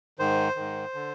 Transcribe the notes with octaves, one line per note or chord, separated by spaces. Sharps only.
G#2 D#3 C5
G#2 D#3
D3